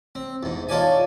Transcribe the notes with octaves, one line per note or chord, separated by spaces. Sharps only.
C4
E2 G#2
D#4 F4 A4 C#5 D5 G#5